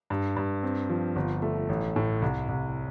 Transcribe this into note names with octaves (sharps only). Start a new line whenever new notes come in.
G2
G2
C4
F3
G1
A3
A1
A2
C2
C2